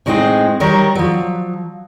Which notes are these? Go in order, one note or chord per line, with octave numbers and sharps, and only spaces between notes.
A2 G3 G#3 C4 D#4 F#5
D#3 F#3 G3 A#4 C#5
F3 F#3